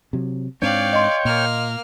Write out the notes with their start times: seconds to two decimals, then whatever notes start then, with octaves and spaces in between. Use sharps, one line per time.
0.13 C3 F#3
0.62 G#2 C4 D4 C#5 D5 F5 G5
0.93 D#5 C6
1.25 A#2 A#3 F6